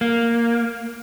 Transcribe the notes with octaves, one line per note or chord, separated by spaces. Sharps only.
A#3